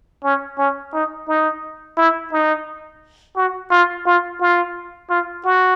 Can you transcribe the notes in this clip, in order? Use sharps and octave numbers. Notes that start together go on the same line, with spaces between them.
C#4
C#4
D#4
D#4
E4
D#4
F#4
F4
F4
F4
F4
F#4